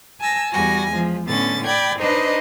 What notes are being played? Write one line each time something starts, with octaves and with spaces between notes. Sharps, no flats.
G#5 A5 E6 A#6
E2 G3 F#4 G#5 A#6
F3 G#3
A2 D3 B3 C#4 A6
D5 G5 B5 G#6
D4 D#4 B4 C5 D#5